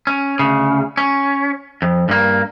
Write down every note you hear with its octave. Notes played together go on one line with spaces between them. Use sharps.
C#4
D2 C#3
C#4
F2
G2 A#3